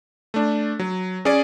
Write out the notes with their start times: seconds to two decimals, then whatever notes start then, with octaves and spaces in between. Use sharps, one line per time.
0.34 A3 D4
0.79 F#3
1.25 C#4 G#4 D5